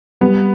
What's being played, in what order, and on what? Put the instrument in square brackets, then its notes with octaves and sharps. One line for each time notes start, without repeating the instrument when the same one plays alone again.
[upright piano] G3 [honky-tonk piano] B3